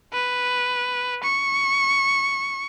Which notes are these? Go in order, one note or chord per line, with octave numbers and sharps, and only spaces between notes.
B4
C#6